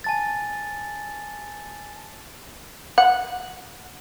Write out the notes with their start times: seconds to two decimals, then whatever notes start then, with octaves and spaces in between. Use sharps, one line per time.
0.04 G#5 A5 A6
2.98 F#5